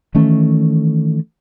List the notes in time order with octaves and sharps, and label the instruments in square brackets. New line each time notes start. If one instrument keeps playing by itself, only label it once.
[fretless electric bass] D#3 E3 A3 C#4